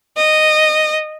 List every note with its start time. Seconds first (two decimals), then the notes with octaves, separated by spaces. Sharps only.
0.16 D#5